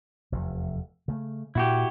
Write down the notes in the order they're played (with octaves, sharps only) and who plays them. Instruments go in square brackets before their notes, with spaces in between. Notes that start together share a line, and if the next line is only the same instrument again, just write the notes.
[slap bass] F1 E2
C#3 A3
[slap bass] A#2 [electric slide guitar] E4 F#4 G4